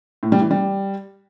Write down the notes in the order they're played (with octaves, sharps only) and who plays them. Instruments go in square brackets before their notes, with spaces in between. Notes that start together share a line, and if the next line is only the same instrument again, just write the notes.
[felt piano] A2
G3
E3
G3